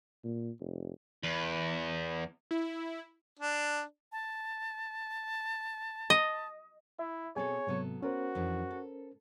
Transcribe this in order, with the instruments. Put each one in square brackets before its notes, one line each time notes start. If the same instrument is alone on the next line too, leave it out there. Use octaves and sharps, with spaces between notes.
[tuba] A#2
F1
[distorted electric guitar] E2
[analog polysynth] E4
[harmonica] D4
[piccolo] A5
[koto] D#5
[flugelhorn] E4 [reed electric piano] E5
[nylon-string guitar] B2 C4 A4 [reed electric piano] G#4 G#5 [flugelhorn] C#5
[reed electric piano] G#2 C3 [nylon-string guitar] F#3 B3 A4
[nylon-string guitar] B3 [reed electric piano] C#4 A#4 C5 [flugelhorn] F#4
[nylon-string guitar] F2 E3 D4
A4